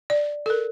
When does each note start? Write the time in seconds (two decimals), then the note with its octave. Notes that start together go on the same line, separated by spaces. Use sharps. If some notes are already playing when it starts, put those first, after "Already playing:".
0.10 D5
0.46 A4
0.50 A#4